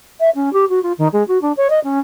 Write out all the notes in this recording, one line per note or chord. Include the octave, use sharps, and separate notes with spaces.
E5
C#4
G4
F#4
F4
D#3
G#3
F#4
D4
C#5
D#5
C#4